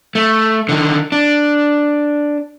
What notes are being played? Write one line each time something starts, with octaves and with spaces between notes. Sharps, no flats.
A3
D3 D#3
D4